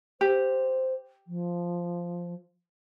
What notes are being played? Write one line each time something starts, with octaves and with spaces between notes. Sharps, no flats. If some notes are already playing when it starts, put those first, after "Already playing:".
G4 C5
F3